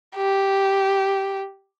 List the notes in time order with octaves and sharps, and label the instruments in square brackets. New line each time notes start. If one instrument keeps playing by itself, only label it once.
[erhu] G4